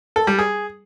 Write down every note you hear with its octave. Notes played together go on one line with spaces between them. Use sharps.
A4
G3
G#4